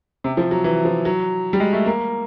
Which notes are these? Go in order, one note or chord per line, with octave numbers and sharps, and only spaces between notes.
C3
F3
F#3
E3
F3
F#3
G3
G#3
A3
A#3